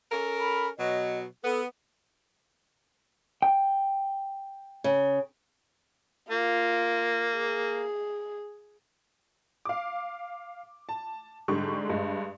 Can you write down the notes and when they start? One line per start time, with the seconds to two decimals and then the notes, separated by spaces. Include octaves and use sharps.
0.11 C#4 A4 A#4
0.40 B5
0.78 B2 F#3 D#5
1.44 B3 A4
3.42 G5
4.84 C#3
6.30 A#3 F4
7.37 G#4
9.65 F5 D6
10.89 A5
11.48 G#2 D3 G3 C#6
11.89 G2 G#3